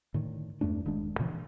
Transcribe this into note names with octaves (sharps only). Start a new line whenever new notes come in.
A2 D3 D#3
E2 G2 A3 D4
D#1 D#3 G#3 D4
A#2 C#3 E3 F3